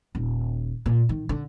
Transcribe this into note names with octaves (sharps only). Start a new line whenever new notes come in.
D#1
A#2
D#3
D3